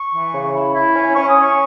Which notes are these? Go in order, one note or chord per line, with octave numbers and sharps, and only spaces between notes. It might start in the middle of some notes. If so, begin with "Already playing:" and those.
Already playing: C#6
E3
C#3
E4
E4
C#4
C#4 C#6
D#6
C#4 C#6